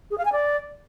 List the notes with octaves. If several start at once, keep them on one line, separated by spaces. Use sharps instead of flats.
G#4
F5
G#5
D5